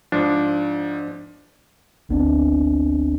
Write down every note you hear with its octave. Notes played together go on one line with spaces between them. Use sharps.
G#2 F3 D4
G#1 D2 B3 C4 D4